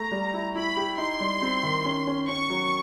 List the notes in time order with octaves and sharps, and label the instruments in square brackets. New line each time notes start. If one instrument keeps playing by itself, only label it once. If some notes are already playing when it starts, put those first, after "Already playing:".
Already playing: [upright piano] A3 [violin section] A#5
[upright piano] G3
E4
[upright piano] E4 [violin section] B5
[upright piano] G4
[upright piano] D#4 [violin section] C6
[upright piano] G3
C4
D#3
C#4
C#4
[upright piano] C#4 [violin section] C#6
[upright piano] F#3